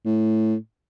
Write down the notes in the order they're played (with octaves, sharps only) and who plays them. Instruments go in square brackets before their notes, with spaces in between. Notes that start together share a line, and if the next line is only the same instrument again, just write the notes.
[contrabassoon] A2